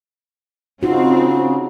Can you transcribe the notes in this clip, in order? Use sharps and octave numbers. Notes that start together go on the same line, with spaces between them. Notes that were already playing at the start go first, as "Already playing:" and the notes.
C#3 C4 D#4 F4 F#4